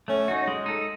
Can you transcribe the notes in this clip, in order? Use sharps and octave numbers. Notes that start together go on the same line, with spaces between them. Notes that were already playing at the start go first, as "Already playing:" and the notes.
A3 C#4
D#4 F#4
G#3
D#4 A4